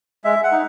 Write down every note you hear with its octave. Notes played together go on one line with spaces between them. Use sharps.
G#3 E5
F#5
D#4